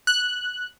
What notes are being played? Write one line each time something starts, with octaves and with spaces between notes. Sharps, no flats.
F#6